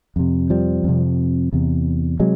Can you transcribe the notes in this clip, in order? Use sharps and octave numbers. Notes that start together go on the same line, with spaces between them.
F2 C3
F3 G3
F2 C3
E2 C3
C3 F#3 G#3